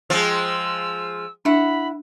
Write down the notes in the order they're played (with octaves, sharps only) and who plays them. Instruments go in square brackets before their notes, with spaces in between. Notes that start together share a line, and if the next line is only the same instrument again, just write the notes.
[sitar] F3 G#3 [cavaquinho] F5 G5 [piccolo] E6
[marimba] D4 [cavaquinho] E4 F#5 [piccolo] B5